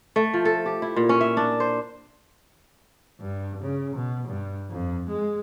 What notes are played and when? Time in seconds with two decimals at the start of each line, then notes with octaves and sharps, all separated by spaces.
0.16 A3
0.33 F3
0.45 A4
0.66 G4
0.82 E4
0.96 A#2
1.09 C#4
1.21 E5
1.37 D4
1.60 C5
3.21 G2
3.62 C#3
3.95 B2
4.28 G2
4.70 F2
5.09 G#3